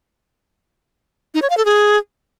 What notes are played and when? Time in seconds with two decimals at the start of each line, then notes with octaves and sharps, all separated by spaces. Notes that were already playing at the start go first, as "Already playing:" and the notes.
1.34 D#4
1.42 C#5
1.50 F5
1.58 A4
1.65 G#4